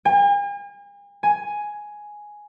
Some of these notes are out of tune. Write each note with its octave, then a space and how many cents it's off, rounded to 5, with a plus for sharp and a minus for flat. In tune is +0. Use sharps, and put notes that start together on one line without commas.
G#5 -45
G#5 +5